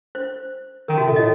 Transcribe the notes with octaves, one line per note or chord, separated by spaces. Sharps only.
C5
D#3 A#4
C3 F#4
A#2 A4
A2 D#5